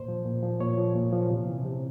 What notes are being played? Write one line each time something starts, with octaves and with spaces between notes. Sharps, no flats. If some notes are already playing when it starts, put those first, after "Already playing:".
Already playing: A#2 C5
F3
A#2
F3
A#2 C#5
F3
A#2
F3
C3
E3
C3